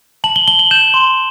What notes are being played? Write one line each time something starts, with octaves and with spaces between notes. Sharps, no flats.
A5 F#7
G7
A5 G7
F#7
G6 E7
C6